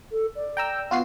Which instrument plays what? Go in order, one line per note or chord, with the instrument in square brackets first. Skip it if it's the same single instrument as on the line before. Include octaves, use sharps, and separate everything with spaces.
[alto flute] A4
D5
[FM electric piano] G5 A#5 E6
[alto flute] B3 [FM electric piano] F4 F#4 C7